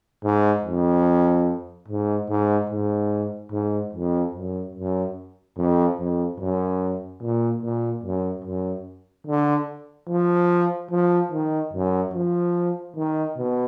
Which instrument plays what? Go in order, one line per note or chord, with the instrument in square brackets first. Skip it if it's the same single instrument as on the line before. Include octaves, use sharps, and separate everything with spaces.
[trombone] G#2
F2
G#2
G#2
G#2
G#2
F2
F#2
F#2
F2
F2
F#2
A#2
A#2
F#2
F#2
D3
F3
F3
D#3
F#2
F3
D#3
B2